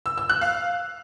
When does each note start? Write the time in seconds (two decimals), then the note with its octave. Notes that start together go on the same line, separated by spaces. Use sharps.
0.06 E6
0.18 E6
0.29 F#6
0.41 F5